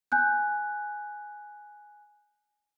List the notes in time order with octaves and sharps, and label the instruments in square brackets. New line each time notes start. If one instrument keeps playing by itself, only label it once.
[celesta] G#5 F#6 G6